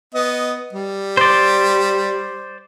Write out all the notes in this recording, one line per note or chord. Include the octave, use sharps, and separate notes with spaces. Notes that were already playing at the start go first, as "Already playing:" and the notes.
B3 D#5
G3
C5 D5